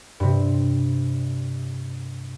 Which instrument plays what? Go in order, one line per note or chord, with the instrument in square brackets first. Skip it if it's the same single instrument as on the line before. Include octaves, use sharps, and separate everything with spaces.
[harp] G2 C3